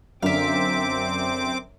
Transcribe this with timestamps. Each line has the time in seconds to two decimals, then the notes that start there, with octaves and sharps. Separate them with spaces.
0.22 F#2 D3 C4 E5 F5 D6